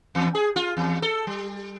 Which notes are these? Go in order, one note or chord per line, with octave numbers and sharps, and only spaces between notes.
E2
G#4
F4
E2
A4
G3